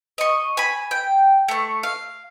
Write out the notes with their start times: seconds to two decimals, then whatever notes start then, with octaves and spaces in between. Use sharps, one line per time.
0.18 D#5 C#6
0.57 G#5 B5
0.91 G5
1.48 A3 C#6
1.83 F5